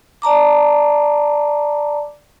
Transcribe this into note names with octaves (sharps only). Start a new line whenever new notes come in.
D5 A5 A#5 D6